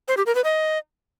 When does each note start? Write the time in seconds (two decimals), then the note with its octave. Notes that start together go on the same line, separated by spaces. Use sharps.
0.08 C5
0.17 G4
0.26 A#4
0.35 B4
0.44 D#5